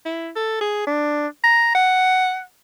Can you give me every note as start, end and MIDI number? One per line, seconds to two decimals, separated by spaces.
0.05 0.30 64
0.36 0.60 69
0.61 0.86 68
0.86 1.27 62
1.43 1.72 82
1.75 2.41 78